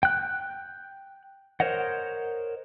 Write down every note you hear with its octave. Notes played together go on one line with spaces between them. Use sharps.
G5 F#6
A#4 C5 C#5 D#5 F#5